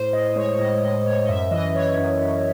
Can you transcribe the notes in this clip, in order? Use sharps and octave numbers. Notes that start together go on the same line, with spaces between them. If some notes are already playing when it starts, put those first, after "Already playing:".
Already playing: A2 C5
A2 D#5
G#3 C#5
A2 D#5
A2 D#5
A2 C#5
D#5
F#2 E5
E3 D#5
E3 C#5
F#2
F#2